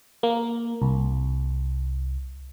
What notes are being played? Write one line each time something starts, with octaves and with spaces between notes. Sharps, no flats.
A#3
C2